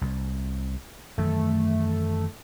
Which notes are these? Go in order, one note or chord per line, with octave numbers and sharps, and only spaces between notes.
C2
F#2 D#3 E3 A3